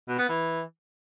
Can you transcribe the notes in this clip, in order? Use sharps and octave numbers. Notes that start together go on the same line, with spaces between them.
B2
B3
E3